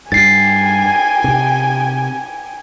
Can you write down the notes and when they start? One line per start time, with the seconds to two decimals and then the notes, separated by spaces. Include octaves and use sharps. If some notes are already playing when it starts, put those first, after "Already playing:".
0.12 G2 G5 G#5 A6 C7
1.24 C3